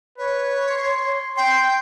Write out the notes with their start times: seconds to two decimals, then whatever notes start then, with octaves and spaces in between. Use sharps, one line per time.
0.18 B4 C#5
0.70 C6
1.37 G5 C6